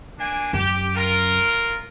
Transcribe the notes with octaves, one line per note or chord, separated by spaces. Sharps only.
A#3 D4 G#5
F#2 G4
F4 A#4